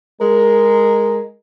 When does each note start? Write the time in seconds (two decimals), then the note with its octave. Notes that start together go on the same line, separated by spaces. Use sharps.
0.22 G#3 A#4